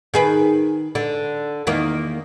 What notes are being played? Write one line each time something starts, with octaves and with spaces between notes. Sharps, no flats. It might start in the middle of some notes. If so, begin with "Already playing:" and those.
D#3 G#4 B4
D3
E2 D#3 A#3